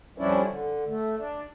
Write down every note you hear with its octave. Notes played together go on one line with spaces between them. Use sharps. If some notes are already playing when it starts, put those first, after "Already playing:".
F2 F3 G3 C#4 D4 E4
D3
A3
D4